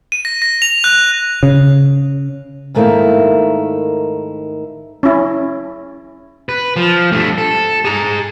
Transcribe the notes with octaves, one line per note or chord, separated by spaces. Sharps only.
D#7
A#6
A#6
F7
F#6
C#3
G#2 D#3 A3 A#3 D#4 E4
C#4 E4
B4
F3
G2 A3
A4
G#4 A#5